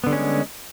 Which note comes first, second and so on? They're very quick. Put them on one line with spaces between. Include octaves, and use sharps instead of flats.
B3 D3 G3 C#4 G#3